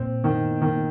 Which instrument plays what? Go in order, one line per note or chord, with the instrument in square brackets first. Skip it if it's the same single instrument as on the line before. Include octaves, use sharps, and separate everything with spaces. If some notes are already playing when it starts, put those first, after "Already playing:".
Already playing: [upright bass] A#2 [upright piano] C4
[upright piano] D#3
D#3